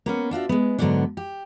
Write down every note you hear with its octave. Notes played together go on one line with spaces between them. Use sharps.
A#3 B3 C#4
D4 F4 F#4 E5
G#3 B3
G#2 D3 F#3 B3 C#4 D4
G4